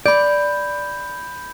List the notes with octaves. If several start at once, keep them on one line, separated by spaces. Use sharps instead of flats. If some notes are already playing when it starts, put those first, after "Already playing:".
D5 B5 G6